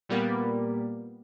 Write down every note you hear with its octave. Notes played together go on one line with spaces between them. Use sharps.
A#2 G3 A#3 B3